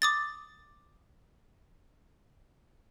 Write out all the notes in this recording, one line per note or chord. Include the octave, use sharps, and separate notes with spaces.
D6 D#6 A6